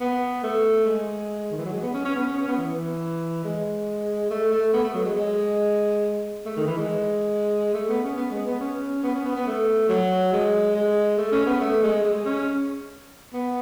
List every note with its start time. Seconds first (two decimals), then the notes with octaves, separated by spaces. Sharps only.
0.01 B3
0.44 A3
0.86 G#3
1.51 D#3
1.58 E3
1.66 F#3
1.72 G#3
1.83 B3
1.94 C#4
2.05 C#4
2.15 B3
2.26 C#4
2.37 C#4
2.48 B3
2.58 E3
3.44 G#3
4.30 A3
4.52 A3
4.73 B3
4.84 A3
4.94 F#3
5.05 G#3
5.16 G#3
6.46 A3
6.57 D#3
6.67 E3
6.77 G#3
7.74 A3
7.89 B3
8.03 C#4
8.17 B3
8.31 G#3
8.46 B3
8.60 C#4
9.03 B3
9.15 C#4
9.25 B3
9.36 B3
9.47 A3
9.89 F#3
10.33 G#3
10.75 G#3
11.18 A3
11.32 C#4
11.47 B3
11.61 A3
11.83 G#3
12.04 G#3
12.25 C#4
13.33 B3